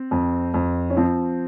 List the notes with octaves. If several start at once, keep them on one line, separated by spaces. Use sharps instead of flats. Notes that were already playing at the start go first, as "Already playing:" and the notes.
Already playing: C4
F2
F2
C#4
F3 C4